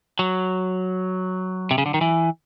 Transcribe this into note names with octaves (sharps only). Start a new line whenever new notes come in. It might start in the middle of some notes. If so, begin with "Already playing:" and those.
F#3
C3
C#3
D3
D#3
E3